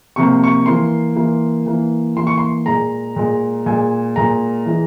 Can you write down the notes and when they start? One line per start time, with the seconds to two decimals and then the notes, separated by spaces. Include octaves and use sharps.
0.16 C3 F3 A#3 C#6
0.44 C#6
0.66 E3 A#3 C6
1.16 E3 A#3
1.66 E3 A#3
2.16 E3 A#3 C6
2.27 C#6
2.38 C6
2.66 A#2 G#3 A#5
3.16 A#2 G#3
3.66 A#2 G#3 G#5
4.16 A#2 G#3 A#5
4.66 E3 G#3